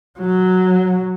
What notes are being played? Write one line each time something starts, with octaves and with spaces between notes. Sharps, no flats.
F#3